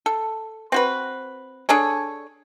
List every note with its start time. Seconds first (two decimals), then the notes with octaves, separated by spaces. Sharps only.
0.06 A4
0.72 C4 F#4 B4
1.69 D4 G#4 A4 C#5